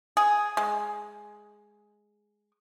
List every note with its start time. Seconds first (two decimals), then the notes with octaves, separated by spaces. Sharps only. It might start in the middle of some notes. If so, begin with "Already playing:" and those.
0.17 G#4
0.57 G#3